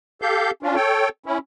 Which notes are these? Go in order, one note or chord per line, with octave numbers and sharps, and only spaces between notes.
G4 A4 F5 G6
C#4 D4 F4
A4 C#5 G5
C#4 E4